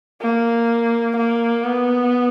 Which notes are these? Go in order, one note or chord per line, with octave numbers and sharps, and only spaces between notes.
A#3
A#3
B3